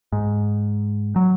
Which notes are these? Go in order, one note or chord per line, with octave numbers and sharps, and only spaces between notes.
G#2
F#3